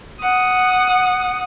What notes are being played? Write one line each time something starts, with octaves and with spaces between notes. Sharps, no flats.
F#5 D#6